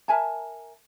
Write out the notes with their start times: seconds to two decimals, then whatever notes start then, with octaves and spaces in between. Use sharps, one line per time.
0.08 A#4 E5 G#5 A5